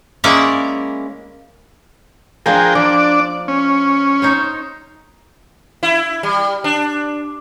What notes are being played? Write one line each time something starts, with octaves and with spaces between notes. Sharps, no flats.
G#3 A#3 C#4 E4 A#4 D5
F3 A#3 D4 G#4 A#4 G5
F3 D4 D5
C#4
D#4 C5 C#5
E4
G3
D4